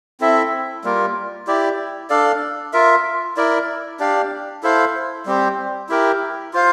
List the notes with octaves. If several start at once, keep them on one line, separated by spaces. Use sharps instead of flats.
C4 E4 A4 E5
G3 A#3 F4 A#4
E4 G4 D5
D4 A4 D5 F5
F4 A#4 E5
E4 A#4 D5
D4 G4 D5 F5
E4 A4 C5 F5
G3 C4 G4 C5
E4 G4 A#4
F4 C5 F5